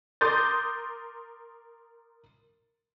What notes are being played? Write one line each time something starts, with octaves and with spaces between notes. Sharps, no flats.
A#4 C6 D6 D#6 G6 A6